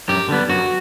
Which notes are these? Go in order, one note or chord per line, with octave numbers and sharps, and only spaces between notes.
F#2 G4
D3 G3 B3
F#2 F#4